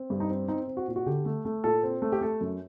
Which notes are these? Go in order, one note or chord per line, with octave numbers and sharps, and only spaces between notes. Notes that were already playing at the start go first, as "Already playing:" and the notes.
Already playing: C4
G2
D#4
C4
C4 D#4
C4
F#4
A#2
F#4
D3 G4
A3
A3
A#2 A4
C4
A3
G4
A3 A4
F#2